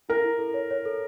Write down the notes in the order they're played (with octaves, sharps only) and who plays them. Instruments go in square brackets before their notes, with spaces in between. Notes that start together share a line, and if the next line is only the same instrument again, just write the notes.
[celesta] E4 [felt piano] A#4
[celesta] E4
A4
C#5
C#5
A4